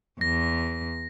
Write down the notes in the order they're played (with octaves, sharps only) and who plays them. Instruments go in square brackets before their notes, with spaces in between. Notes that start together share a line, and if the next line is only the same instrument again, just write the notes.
[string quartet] E2 [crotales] A#6